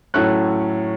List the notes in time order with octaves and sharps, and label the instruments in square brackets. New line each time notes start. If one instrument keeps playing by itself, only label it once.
[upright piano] A2 F#3 A3 C#4 F#6